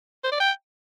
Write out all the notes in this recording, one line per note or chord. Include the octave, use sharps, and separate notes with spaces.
C5
D5
G5